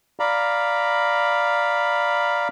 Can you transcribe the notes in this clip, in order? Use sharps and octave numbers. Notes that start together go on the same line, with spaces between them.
D5 F5 A#5 B5